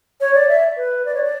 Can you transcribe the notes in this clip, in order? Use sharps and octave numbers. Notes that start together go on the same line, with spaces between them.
C#5
D5
E5
B4
D5
C#5
D5